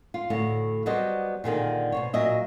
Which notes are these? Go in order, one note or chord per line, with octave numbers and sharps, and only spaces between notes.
F4
D2 A2 C#5
F#3 G3 B3 G4 C5 D#5
A#2 D3 D#3 G#4
B2 C5 C#5
A#2 F#3 D#5 E5